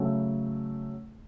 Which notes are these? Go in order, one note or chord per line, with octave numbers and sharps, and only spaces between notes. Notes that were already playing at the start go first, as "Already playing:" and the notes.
Already playing: C#3 F#3 A3